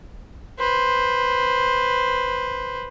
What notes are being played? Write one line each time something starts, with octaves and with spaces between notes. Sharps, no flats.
B4 C5